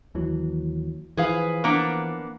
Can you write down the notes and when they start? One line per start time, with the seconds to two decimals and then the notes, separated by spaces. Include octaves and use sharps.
0.15 D#2 E3 F#3
1.17 E3 F3 G#4 B4 F5
1.64 A#3 B3 D4